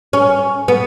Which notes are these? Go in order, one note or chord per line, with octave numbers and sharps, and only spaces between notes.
C#4
B3